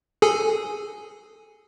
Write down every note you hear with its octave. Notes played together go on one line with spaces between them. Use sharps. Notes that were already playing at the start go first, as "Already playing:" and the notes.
G#4 A4 G#5